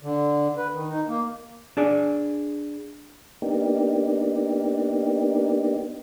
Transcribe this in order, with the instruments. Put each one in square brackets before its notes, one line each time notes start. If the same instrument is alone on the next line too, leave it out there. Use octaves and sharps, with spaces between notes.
[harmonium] D3
B4
D#3
D#4
A#3
[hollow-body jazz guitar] D4 G#4 D5
[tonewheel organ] A#3 B3 D4 D#4 G4